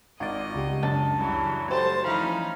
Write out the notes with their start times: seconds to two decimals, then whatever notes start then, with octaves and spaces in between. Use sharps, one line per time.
0.20 G#1 F4 D5 D#5
0.54 C#2 G3
0.83 F#2 D4 A5 A6
1.17 C#3 E3 F#3
1.71 F#3 G3 A3 C5 A5
2.04 E3 F3 A3 C#4 D#4 F5 B5